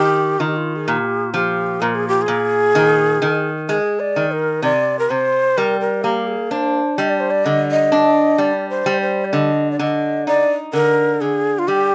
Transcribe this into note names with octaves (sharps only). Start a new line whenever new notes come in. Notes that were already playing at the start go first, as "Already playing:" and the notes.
Already playing: D#3 G4
D#3 F4
G4
F4
G#4
A#2 G4
F3 G4
A#2 A#4
G#4
G4
G#4
A#2
D#3
D#3
G#3 G#4
D5
D#3
A#4
C3 D5
A#4
C3 C5
G3 A#4
A#4
A#3 G4
G#4
D4 C5
G3 D#5
D5
C5
D5
D3 D#5
D#5
D4
G3 D5
C5
G3
C5
D5
D3 D#5
D5
D3 D#5
D#4 D5
D3 A#4
D3 G#4
F4
G3 G4